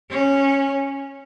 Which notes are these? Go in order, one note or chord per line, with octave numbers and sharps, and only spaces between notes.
C#4